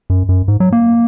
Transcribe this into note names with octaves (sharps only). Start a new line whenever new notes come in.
F#2
F#2
G#2
F#3
A#3